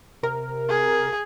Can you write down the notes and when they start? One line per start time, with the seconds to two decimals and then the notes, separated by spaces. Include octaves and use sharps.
0.23 C3 A#4
0.69 G#4